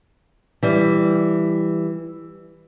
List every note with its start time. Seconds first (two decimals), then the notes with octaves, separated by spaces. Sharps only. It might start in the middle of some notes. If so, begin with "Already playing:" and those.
0.63 E3 G3